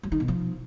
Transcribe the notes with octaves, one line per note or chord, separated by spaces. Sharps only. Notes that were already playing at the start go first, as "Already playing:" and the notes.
F#3
D#3
B2
F3